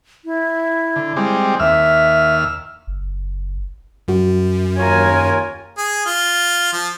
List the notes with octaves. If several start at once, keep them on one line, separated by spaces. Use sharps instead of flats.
E4
D3
G3 G#3 C4
D#2 E5 E6 F6
F#1
F#2 F#3 F#4
D#2 F4 A#4 C#5 G#5
G#4
F4
F3